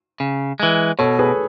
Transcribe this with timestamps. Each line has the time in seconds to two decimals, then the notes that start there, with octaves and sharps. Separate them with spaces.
0.20 C#3
0.60 E3 G#3
0.99 B2 A4 C#5
1.19 G#4 B4